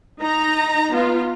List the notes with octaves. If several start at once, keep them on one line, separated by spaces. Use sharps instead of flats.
D#4 A#5
B3 F4